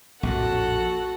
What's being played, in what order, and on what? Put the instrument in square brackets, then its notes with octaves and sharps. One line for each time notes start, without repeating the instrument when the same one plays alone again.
[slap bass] A#1 F2 A2 [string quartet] F#4 A4 F#5